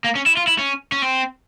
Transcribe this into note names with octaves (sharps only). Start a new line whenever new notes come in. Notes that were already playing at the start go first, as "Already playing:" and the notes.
A#3
C#4
E4
F4
E4
C#4
C#4
C4